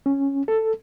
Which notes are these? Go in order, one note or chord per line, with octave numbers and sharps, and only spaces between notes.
C#4
A4